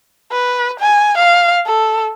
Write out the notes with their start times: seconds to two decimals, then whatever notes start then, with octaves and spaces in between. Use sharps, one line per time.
0.32 B4
0.79 G#5
1.17 F5
1.66 A4